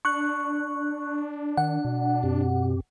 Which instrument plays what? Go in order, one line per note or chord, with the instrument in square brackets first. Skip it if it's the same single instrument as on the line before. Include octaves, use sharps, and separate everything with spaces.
[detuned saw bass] D4 [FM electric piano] C#6 F#6
[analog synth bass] D#3 [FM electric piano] F#5
[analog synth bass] B2
[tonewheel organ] F#2 C4 G4